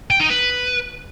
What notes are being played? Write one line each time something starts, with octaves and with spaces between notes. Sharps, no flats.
G5
D#4
B4